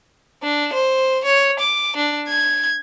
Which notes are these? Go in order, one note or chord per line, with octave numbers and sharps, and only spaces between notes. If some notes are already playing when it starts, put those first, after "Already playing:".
D4
C5
C#5
D6
D4
G#6